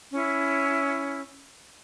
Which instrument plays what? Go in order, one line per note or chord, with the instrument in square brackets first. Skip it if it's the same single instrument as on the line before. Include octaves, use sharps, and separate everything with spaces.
[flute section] C#4 E4